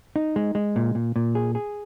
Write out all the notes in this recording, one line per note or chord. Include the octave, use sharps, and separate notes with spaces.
D#4
G#3
G#3
A#2
A#2
A#2
G#4
G#4